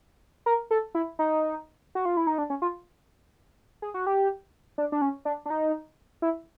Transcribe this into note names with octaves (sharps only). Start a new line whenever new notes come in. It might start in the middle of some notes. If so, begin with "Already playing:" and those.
A#4
A4
E4
D#4
F#4
F4
E4
D#4
D4
C#4
F4
G#4
F#4
G4
D4
D4
C#4
D4
D4
D#4
E4